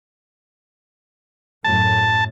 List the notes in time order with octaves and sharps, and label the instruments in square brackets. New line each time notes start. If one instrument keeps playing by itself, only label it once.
[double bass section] F#2 A2 [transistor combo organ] A5